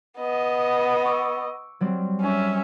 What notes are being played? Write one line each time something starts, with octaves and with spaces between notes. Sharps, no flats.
B3 D#5
C#6 D6 E6
F#3 G3 C4
C#4 E5